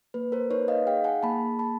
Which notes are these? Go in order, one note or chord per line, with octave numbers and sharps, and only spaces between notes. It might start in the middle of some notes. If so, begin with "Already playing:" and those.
A#3 B4
A#4 C5
D#4 B4 C#5
D#5 F5
G#4 F5 G5
F#5 G#5
A#3 A5 B5
A#3 A5 B5